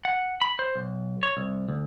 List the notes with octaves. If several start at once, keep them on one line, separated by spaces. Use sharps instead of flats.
F#5
B5
C5
B1
C#5
C2
D2